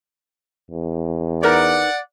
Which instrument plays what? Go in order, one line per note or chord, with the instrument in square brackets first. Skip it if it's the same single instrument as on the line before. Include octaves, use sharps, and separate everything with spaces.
[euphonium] E2
[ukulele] D#4 A#4 B4 [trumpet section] D5 F#5